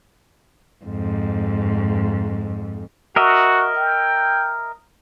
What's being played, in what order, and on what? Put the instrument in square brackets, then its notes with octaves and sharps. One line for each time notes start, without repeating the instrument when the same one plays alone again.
[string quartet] F2 G#2
[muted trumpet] F#4 [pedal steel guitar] A#4 D#5 E5
[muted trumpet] G5